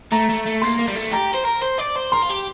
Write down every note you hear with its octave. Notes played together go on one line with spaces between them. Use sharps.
A3 A#5
A3
A3
A#3 C6
A#3
G3
A3
G4 A#5
C5
A#4
C5
D5
C5
A#4 C6
F4
G4